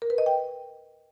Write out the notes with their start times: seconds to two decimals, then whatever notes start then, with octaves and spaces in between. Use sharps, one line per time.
0.02 A#4
0.10 B4
0.18 D#5
0.26 G5